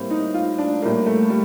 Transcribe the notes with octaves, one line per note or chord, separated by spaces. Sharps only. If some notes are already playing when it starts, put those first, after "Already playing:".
Already playing: A2 G3 A#3 C4
D#4
F4
D4
A2 G3 A#3
A3
G3